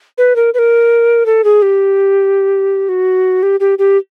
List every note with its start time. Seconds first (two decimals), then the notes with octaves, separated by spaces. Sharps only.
0.18 B4
0.36 A#4
0.54 B4
0.59 A#4
1.26 A4
1.44 G#4
1.62 G4
2.89 F#4
3.43 G4
3.60 G4
3.79 G4